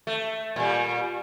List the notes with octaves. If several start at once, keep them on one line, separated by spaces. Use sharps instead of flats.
A3
A#2 G3